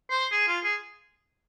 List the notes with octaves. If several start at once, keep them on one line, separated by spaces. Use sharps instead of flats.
C5
G#4
F4
G#4